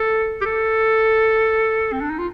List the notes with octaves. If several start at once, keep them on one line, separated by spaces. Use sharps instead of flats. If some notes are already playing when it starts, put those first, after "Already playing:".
Already playing: A4
G4
A4
C4
D4
D#4
F4